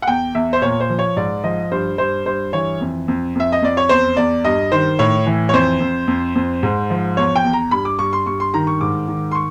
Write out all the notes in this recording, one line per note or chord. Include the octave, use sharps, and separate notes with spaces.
F#5
E2 G5
E2 E5
C5
A#2 C#5
C5
F3
C#5
G#2 D5
F3 D#5
G2 C5
G2 C5
G2 C5
E3 C#5
F2
F2
F2 E5
D#5
F2 D5
C#5
E2 C5
E2 D5
G2 D#5
D#3 C5
A2 C#5
E3
C#5
F2 C5
F2
F2
F2
G#2
F3
E2 C#5
G5
E2
A#5
G2 B5
D6
G2 C#6
C6
G2 C#6
C6
D#3 A#5
C#6
G#2 D6
D#3
C6
C#6